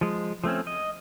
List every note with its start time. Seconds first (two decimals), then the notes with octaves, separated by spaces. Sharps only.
0.01 F3 G#3
0.44 F3 A3 C4 C#4
0.67 D#5